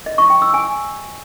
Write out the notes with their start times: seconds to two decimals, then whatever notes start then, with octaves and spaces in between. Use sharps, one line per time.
0.06 D#5
0.18 C#6
0.30 G5
0.42 E6
0.54 G#5